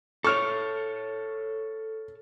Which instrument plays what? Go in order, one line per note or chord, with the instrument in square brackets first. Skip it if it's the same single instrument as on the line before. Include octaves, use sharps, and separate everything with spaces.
[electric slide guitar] A4 C#5 [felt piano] C#6 F6